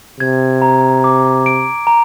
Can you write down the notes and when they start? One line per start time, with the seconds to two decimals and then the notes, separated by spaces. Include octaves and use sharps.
0.20 C3 G#6
0.62 A#5
1.04 D6
1.46 D7
1.87 A#5